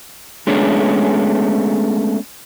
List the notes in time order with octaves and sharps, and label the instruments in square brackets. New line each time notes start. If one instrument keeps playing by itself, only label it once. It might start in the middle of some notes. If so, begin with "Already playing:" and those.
[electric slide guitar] G#3 A3 B3 C#4 D4 G#4